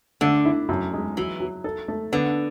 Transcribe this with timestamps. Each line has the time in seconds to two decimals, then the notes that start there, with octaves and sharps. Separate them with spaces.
0.21 D3 A3
0.45 E4
0.69 F#2
0.93 G#3
1.17 E3 F#3
1.40 F#3
1.64 A4
1.88 A3
2.12 D3 B3